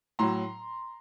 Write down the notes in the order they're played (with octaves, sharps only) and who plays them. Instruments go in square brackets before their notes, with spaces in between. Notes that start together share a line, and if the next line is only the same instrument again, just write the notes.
[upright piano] A2 F#3 A#5 C6